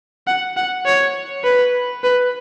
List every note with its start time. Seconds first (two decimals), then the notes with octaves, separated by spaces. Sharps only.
0.27 F#5
0.57 F#5
0.85 C#5
1.44 B4
2.03 B4